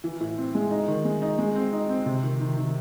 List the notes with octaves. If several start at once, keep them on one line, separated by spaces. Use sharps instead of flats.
E3
A2
C4
G#3
D#4
D#3
G#3
D#4
G#3
C4
D#4
C4
C3
D#3
D#3
D#3